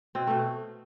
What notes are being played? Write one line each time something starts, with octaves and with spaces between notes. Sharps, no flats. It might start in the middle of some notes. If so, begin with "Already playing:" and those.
B2 C4
B2 A3